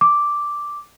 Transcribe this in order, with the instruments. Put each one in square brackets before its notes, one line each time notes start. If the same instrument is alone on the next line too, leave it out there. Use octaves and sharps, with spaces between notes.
[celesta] D6